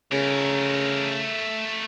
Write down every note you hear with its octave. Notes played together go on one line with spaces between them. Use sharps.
C#3 A3 A#4